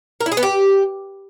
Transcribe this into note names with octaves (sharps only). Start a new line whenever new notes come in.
A#4
E4
G#4
B3
G4